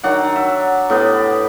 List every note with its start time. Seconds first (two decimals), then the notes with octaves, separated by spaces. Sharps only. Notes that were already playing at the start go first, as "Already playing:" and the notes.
0.03 D#3 F#3 D4 F#5
0.36 E5
0.90 A2 B3 G4 D5